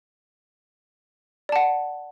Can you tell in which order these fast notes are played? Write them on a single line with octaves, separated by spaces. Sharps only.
D5 A5 F#5